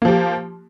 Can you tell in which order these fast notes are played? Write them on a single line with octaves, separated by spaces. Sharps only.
A#3 F3 G4